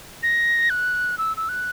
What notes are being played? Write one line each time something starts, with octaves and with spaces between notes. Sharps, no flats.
A#6
F#6
E6
E6
F#6